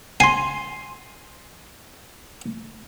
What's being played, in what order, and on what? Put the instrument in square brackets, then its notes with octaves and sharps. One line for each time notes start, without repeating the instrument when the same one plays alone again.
[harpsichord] G#5 [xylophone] C6 C7